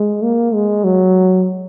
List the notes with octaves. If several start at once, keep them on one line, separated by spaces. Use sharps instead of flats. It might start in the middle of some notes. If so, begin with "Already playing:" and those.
Already playing: G#3
A#3
G#3
F#3